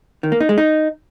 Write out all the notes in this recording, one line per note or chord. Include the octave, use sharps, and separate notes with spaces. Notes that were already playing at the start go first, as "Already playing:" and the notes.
D#3
A#3
D#4
G#3
D#4